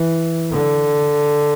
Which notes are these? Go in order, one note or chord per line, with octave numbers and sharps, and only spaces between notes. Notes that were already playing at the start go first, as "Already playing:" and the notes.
Already playing: E3
D3